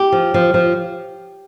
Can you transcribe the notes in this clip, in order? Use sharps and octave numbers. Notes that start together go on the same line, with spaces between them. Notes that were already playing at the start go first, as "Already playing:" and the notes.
Already playing: G4
F3
F3
F3